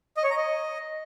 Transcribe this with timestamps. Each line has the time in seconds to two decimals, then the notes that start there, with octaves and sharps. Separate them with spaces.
0.17 D#5
0.24 C#5
0.30 A#5
0.37 D#5